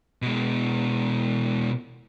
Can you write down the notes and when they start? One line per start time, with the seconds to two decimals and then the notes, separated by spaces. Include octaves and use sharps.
0.22 B2 G#3